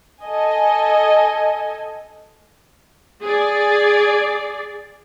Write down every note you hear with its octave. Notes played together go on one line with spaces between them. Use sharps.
A4 D#5 G#5
G#4 D5